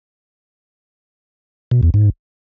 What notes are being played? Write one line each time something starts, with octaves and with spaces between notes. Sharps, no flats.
B2
E2
G#2